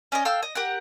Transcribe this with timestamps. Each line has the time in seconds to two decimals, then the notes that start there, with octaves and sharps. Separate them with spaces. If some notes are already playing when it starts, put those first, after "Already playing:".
0.12 C#4 D5 D#5
0.25 A4 F5 G5 E6
0.43 D#5
0.55 G4 A#4 F#5